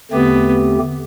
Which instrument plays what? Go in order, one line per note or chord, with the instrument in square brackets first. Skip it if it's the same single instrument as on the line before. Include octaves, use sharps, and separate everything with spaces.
[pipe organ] E2 D3 A3 C4 G4 [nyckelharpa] B3